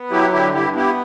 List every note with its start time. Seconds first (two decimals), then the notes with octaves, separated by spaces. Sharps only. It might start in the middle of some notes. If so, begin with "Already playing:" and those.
Already playing: B3
0.10 F#3 E4 G4
0.32 D3 E4 G4
0.54 G2 E4 G4
0.75 B3 E4 G4